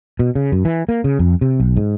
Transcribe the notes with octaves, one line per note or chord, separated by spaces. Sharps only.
B2
C#3
F#2
E3
A#3
C#3
F2
C3
B1
G#2